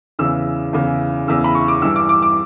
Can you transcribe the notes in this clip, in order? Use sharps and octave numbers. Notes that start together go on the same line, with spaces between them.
E2 C#3 E3 E6
E2 C#3 E3
E2 C#3 E3 E6
B5
C#6
D6
G2 E3 E6
D6
D6
D6